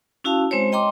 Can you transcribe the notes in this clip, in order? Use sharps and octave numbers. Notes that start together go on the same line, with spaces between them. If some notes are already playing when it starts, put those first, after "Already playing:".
C#4 E4 F#4 F5 A5
G#3 C4 C5 C#5
D#5 G5 A#5 C6 D6